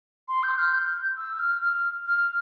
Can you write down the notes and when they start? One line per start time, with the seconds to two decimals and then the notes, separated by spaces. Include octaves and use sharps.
0.28 C6
0.43 G6
0.58 F6
0.73 G6
1.17 E6
1.39 F6
1.62 F6
2.06 F6